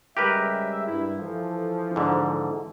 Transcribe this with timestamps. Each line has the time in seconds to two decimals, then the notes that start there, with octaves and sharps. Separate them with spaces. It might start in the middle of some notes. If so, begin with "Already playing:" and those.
0.17 C#3 G3 G#3 G4 A#4 B4 E5
0.87 G2 E4
1.19 E3 F3 A4
1.96 G#2 D3